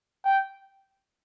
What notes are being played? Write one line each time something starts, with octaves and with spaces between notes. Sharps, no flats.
G5